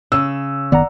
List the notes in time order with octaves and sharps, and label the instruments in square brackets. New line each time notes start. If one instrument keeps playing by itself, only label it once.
[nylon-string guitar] C#3 [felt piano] E6
[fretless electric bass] F#1 D#3 B3 [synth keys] D5 F#5 A#5